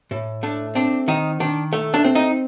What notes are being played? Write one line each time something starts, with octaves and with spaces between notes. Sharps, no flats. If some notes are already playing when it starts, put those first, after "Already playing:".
A2
A3 D4
C4 D4
D#3 D#4
D#3 D4
A3
D4
C4
D#4